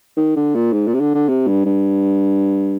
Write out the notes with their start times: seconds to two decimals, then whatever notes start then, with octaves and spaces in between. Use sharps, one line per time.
0.17 D#3
0.36 D3
0.55 A#2
0.72 G#2
0.87 A#2
0.94 C3
1.00 D3
1.15 D3
1.29 C3
1.47 G2
1.65 G2